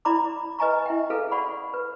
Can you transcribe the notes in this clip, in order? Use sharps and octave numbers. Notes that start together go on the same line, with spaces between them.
E4 D5 A#5 B5 D6
B4 D#5 G#5 A#5 C#6
E4 E5 G5
G#4 A4 B4 F5
D5 F#5 B5 C#6
B4